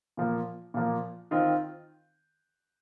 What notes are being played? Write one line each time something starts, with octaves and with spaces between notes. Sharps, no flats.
A#2 F3 A#3
A#2 F3 A#3
D#3 C4 F4